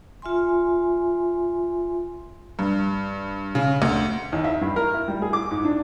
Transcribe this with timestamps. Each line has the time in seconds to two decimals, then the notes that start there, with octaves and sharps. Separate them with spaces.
0.22 F4 E5 G#5 C6
2.59 G2
3.55 C#3
3.82 D2
4.32 D#2
4.44 E5
4.61 G2
4.76 A#4
4.94 E4
5.08 G3
5.22 G#4
5.33 D6
5.51 G#2
5.65 D4